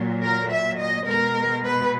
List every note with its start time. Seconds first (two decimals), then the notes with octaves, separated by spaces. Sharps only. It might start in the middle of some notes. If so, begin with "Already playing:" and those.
Already playing: A#2 F#3
0.22 A#4
0.50 E5
0.78 D#5
1.06 B2 G#3 A#4
1.64 B4